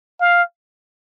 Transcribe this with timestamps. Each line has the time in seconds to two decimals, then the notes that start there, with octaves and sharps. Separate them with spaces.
0.21 F5